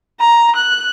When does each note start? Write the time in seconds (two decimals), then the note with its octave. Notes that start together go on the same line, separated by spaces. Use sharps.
0.20 A#5
0.56 F#6